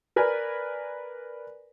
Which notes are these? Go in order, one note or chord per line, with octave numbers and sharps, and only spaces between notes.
A#4 B4 D5 G#5